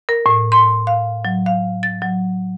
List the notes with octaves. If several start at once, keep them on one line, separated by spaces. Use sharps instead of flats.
A#4
A2
C6
F5
F#3
F5
A6
F#3